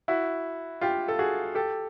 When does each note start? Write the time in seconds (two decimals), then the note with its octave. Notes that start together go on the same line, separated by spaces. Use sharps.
0.08 E4 F#4
0.81 F4 G4
1.08 A4
1.19 F#4 G#4
1.55 G4 A4